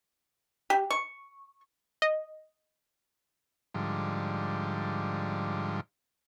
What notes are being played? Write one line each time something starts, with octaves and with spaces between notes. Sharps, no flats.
G4
C#6
D#5
G#2 D3 F3 G3